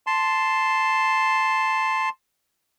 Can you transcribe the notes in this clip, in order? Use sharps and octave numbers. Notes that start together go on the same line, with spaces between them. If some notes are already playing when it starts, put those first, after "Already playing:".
A5 C6